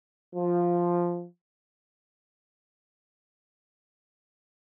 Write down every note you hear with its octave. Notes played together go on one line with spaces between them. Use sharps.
F3